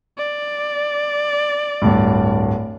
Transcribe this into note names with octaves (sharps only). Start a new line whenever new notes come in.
D5
D1 G2